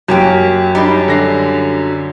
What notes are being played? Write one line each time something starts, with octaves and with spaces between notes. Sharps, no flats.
F#2 F#3 A#3 G4
G3 D4 D#4 B5
D3 A#6 C7